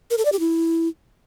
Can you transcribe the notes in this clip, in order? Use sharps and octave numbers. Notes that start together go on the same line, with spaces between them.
A#4
A4
D5
G4
E4